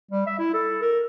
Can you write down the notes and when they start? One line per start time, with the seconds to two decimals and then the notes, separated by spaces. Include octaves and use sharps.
0.11 G3
0.27 E5
0.39 E4
0.54 A4
0.82 A#4